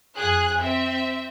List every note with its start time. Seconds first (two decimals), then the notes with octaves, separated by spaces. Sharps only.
0.18 F2 G#4 F#6
0.61 C4 E5